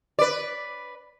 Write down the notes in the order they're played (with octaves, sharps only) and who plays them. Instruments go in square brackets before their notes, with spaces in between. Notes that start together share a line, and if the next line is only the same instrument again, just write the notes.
[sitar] B4 D5